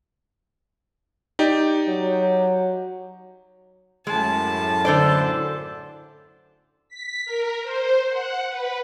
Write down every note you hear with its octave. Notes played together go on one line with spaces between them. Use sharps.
D#4 G4 D5
F#3
F#2 A2 G#3 A5
D3 C5 D5
B6
A#4
C5
F#5
B4